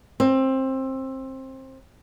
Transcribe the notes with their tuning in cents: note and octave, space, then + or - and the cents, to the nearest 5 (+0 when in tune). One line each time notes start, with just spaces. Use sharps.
C4 +20